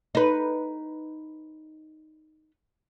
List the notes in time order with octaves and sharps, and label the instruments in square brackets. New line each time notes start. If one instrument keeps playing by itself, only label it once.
[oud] D#4 B4